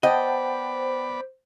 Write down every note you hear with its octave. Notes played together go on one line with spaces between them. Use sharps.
B3 C5 D5 D#5 F#5 G5 A5 B5